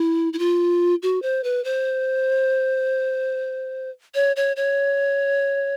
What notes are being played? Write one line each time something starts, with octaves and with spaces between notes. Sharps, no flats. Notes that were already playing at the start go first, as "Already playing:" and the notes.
Already playing: E4
E4
F4
F#4
C5
B4
C5
C#5
C#5
C#5